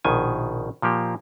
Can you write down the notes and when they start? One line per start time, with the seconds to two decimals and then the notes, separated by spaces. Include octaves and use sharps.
0.04 A#1 B2 D#3 G#5
0.82 A#2 F3 A#3 G4